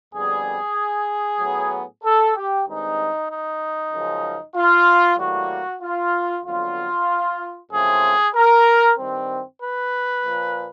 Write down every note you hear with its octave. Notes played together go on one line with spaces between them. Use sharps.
F2 D3 G3 B3 G#4
A2 F#3 B3
A4
G4
G2 D#3 G#3 C4 D#4
D#4
F#2 C#3 F3 G#3
F4
A2 E3 G3 A#3 F#4
F4
F2 D3 F#3 B3 F4
F#2 C#3 F3 A3 C4 G#4
A#4
G2 D#3 G3 C4
B4
A#2 F3 A#3